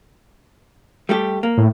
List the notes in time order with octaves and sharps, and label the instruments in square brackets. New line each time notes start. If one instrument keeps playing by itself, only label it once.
[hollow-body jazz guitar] G3 A3 G4
A#3
[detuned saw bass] A2